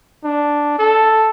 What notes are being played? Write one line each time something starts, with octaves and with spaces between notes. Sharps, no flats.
D4
A4